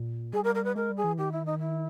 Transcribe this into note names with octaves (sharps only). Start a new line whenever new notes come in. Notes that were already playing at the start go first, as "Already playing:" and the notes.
Already playing: A#2
G3 G#4
A#4
A#4
B4
G#3 A#4
G3
G#4
E3
D#3 G4
E4
D#4
E4